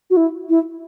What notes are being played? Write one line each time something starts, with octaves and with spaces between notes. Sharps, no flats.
F#4
E4
E4